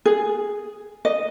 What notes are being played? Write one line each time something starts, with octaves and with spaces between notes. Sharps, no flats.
G#4
D#5